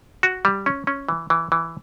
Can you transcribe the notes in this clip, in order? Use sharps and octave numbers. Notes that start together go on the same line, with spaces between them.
F#4
G3
C#4
C#4
E3
E3
E3